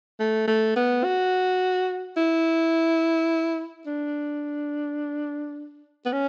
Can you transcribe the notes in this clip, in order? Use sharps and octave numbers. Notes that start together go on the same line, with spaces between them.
A3
A3
B3
F#4
E4
D4
B3
C#4